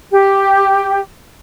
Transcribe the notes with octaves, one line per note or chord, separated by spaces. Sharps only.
G4